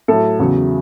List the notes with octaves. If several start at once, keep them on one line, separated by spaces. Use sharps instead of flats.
A2 F#3 A4
E2 C#3 F#3